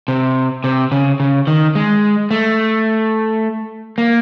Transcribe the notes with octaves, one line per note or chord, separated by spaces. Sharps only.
C3
C3
C#3
C#3
D#3
G#3
A3
A#3